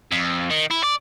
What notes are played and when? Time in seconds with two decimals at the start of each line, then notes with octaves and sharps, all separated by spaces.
0.12 F2
0.50 D#3
0.71 E4
0.84 D5